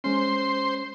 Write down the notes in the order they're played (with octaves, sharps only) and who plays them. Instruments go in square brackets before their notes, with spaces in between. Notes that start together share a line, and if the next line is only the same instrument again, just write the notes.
[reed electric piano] G#3 C#4 [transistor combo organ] C5 C6